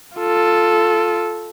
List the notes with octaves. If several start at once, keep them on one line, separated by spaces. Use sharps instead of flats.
F4 A4